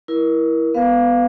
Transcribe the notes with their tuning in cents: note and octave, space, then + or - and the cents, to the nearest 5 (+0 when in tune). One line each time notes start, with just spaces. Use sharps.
E4 +0 A#4 +25
B3 +0 B4 +20 F5 +0